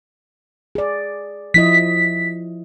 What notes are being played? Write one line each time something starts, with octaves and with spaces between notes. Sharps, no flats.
G#4 D5
F3 E4 D#5 B6